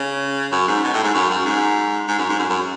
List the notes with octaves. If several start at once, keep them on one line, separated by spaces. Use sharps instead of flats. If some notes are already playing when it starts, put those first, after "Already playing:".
Already playing: C#3
F#2
G#2
B2
A2
G#2
F#2
F#2
G#2
G#2
F#2
G#2
F#2
F#2